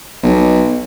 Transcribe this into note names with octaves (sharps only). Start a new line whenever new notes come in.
B1